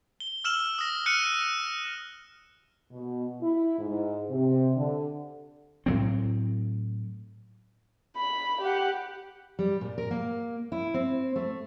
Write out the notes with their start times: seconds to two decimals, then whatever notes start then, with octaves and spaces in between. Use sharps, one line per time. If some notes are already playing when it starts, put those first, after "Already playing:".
0.20 G7
0.44 E6 F6 E7 F#7
0.79 D#6 A#6
1.06 F6 F#6 C#7 D#7
2.90 B2
3.41 E4
3.78 G#2
4.30 C3
4.75 D3
5.86 A2 F#3 C4
8.16 B5
8.61 G4 F#5
9.59 G3
9.81 A#2
9.98 A#4
10.11 A#3
10.72 E4
10.94 C4
11.36 A3